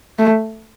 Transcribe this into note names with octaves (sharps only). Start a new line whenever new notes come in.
A3